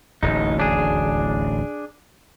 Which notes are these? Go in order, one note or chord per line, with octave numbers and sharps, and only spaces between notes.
D1 A1 D#2 D#4
D4 G#4